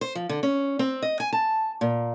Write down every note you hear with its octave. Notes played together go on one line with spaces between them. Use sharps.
C5
F3
D3
C#4
C4
D#5
G#5
A5
A#2